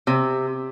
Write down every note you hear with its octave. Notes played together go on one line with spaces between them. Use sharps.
C3